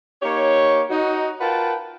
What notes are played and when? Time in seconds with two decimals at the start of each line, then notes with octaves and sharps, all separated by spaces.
0.23 A#3 D#4 G4 C#5
0.90 D#4 F#4
1.41 F4 A#4 B4 F#5 G5 A5